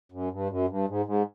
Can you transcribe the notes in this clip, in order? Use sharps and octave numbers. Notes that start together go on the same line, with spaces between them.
F#2
G2
F#2
G2
G#2
G#2